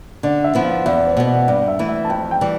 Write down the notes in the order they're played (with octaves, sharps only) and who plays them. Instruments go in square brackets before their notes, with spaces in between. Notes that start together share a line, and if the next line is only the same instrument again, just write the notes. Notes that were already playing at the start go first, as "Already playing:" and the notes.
[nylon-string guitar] D3 [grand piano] D5
[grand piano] E5
[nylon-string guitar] F3 B3 E4
[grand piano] F5
[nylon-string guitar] E2 [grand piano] E5
[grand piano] C5
[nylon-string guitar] B2 B3
[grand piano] D5
[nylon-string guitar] G2 [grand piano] D5
[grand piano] E5
[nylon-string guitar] E3 A3 E4
[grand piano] E5
A5
[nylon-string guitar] F2 [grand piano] G5
[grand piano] G5
[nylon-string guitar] E3 G3